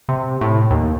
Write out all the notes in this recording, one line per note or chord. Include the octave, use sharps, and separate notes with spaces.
C3
A2
D#2